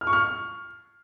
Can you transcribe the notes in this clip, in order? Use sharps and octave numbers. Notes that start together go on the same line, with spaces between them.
F6
C#6
F6